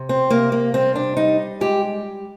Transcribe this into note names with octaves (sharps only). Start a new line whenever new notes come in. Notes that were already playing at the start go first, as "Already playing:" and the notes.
Already playing: C3
C4
C3 A#3
A#3
G3 C4
D4
G3 D#4
G#3 G4